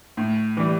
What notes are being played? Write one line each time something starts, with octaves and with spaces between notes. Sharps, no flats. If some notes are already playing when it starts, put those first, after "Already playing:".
A2
E3 G3